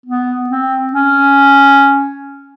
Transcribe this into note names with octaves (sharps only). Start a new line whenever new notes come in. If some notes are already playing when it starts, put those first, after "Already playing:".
B3
C4
C#4